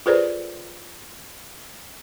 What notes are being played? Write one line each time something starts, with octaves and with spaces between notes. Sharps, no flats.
F4 G#4 A4 B4 C5 D5